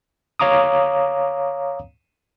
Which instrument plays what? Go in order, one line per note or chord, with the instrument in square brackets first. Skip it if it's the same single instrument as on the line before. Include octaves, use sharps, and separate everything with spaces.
[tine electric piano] C#5 F5 A#5 D6 D#6